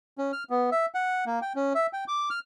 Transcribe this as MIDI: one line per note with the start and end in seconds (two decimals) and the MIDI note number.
0.18 0.32 61
0.32 0.44 89
0.50 0.70 59
0.72 0.86 76
0.95 1.24 78
1.26 1.39 58
1.42 1.53 79
1.56 1.73 61
1.75 1.87 76
1.93 2.04 79
2.08 2.29 86
2.30 2.39 89